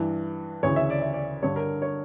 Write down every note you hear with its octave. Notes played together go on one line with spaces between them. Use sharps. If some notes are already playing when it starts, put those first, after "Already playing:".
Already playing: G2 E3 B4
D2 C#3 E3 C#5
E5
D5
E5
D5
G2 D3 C#5
A#4
C#5